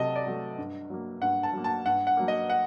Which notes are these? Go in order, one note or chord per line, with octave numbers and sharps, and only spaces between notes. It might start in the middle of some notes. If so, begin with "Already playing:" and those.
Already playing: C3 F#3 A3 D#5 A5
D5
F#3 A3
G2
F#3 A#3
G2 F#5
A5
F#3 A#3
A5
G2 F#5
F#5
F#3 A#3
D#5
F#5